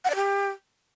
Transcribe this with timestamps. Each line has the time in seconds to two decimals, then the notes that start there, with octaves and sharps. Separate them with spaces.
0.05 F#5
0.10 D5
0.15 G4